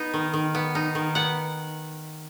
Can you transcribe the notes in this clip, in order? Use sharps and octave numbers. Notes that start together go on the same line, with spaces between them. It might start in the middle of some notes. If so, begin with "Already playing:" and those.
Already playing: B3 D#4
D#3
D#3
B3
D#4
D#3
B3 F#5